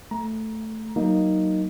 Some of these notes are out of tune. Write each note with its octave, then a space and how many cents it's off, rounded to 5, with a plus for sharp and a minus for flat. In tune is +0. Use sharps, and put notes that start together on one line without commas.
A3 +0 A#5 +15
F#3 +15 A#3 +0 D#4 +0